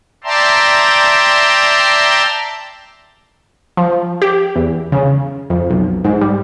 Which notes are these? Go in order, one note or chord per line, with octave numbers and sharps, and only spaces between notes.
D5 E5 G5 A5 A#5 C6
F3
G4
E2
C#3
F2
B1
G#2
G3